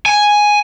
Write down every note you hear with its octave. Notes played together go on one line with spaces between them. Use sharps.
G#5